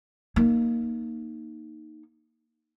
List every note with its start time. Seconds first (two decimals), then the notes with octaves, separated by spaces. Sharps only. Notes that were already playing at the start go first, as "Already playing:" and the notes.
0.36 A#3 D#4